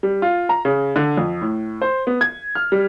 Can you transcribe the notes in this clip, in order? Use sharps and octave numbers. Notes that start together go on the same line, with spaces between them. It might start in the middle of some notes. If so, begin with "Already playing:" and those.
G3
F4
A#5
C#3
D3
F2
A2
C5
B3
G#6
F6
G3